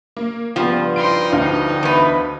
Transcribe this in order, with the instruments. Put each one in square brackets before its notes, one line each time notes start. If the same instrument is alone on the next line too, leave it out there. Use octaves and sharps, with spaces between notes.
[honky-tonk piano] A#3
[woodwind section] G2 [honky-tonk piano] C#3 B3 [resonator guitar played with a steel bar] F3
[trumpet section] D#4 E4 C6 [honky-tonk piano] D7
[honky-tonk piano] D2 D3 F5 [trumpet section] D#4
[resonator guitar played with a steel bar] E2 B4